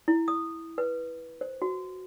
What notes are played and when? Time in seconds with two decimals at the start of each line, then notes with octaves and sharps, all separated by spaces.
0.08 E4
0.28 D#6
0.78 B4
1.41 C5
1.62 F#4